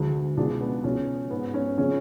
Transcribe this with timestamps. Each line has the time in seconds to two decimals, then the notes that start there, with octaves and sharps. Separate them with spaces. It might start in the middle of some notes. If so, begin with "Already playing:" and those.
Already playing: D2 D3 G#3
0.37 C#2 B2 G#3 D4
0.61 B3
0.84 C#2 B2 G#3 C#4
1.31 G#2 G#3 B3
1.54 C#4
1.77 C#3 F3 G#3 C#4